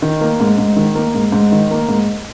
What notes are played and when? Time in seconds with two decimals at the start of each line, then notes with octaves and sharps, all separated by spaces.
0.02 D#3
0.21 A#3
0.40 G#2
0.58 G#2
0.76 D#3
0.95 A#3
1.14 G#2
1.32 G#2
1.52 D#3
1.71 A#3
1.89 G#2